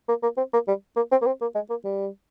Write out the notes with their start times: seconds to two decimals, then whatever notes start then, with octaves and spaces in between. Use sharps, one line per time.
0.08 A#3
0.23 A#3
0.37 C4
0.53 A#3
0.68 G3
0.96 A#3
1.11 C4
1.22 A#3
1.26 C4
1.41 A#3
1.55 G#3
1.70 A#3
1.85 G3